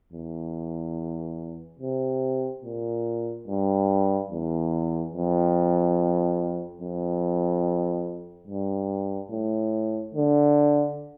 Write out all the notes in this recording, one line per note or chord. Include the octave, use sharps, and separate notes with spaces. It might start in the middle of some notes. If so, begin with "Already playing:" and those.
E2
C3
A#2
G2
E2
F2
F2
G2
A2
D3